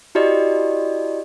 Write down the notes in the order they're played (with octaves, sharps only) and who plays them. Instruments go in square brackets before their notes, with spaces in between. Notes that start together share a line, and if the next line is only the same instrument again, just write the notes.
[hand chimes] E4 F#4 G4 D5 D#5